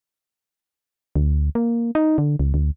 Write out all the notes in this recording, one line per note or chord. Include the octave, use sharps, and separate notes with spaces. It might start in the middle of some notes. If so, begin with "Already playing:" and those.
D2
A#3
D#4
D3
C#2
D2